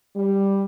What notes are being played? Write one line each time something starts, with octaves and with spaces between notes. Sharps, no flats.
G3